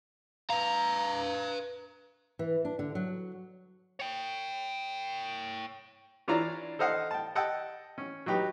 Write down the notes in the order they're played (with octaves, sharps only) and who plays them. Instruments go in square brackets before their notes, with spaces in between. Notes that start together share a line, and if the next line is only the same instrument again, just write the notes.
[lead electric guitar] B4 F5 [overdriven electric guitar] A#5
[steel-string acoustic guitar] E3
D4
D3
F#3
[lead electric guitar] C#5 G5
[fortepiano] E3 D4 F4 C#5 D5 A#5
A4 C5 D#5 F5 F#5
G5 A5
D#5 F#5 G5 A5 E6
C#4
F#3 D#4 G4 B4